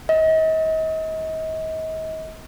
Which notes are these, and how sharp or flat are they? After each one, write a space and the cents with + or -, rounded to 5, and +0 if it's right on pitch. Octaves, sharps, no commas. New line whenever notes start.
D#5 +40